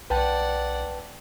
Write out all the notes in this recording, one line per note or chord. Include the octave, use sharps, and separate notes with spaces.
B1 B4 D5 F#5 G5 A5